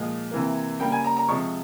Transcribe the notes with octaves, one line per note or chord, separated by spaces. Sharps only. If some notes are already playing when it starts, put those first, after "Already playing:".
Already playing: A#2 F3 G#3
C3 E3 A#3
C#3 G3 A#3 G5
G#5
A#5
A#5
C3 F3 G#3 C#6